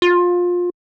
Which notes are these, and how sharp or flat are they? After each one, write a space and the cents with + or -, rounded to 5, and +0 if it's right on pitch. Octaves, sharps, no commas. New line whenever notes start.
F4 +20